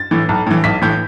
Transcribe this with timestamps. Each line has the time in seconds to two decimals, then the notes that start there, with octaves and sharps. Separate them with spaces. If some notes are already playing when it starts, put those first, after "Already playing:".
Already playing: A6
0.11 A2 E3
0.29 B1
0.47 A2 E3
0.64 B1 B6
0.82 A2 E3 G6